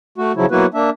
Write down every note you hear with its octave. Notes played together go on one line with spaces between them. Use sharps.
A3 F#4
C#3 F3 F#3 E4
F#3 A#3 B3 E4 F#4 B4
A#3 D4 E5